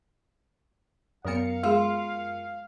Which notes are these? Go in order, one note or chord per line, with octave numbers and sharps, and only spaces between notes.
F#2 F#3 B3 A#4 F5 C#7
G#3 F4 G#4